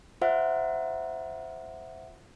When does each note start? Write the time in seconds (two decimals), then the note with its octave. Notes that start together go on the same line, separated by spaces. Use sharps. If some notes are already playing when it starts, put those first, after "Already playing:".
0.22 F4 C5 E5 F#5